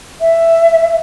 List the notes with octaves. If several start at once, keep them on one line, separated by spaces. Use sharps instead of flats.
E5